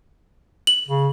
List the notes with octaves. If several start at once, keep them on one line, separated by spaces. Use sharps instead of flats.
F#7
C#3